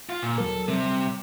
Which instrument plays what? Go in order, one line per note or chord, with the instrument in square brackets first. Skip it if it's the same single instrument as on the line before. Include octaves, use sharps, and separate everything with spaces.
[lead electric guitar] F4
A#2
[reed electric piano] D#2 F#3 A#4 [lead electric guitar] A4
[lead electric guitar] C3 [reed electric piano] G3